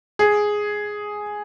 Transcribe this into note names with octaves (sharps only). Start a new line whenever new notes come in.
G#4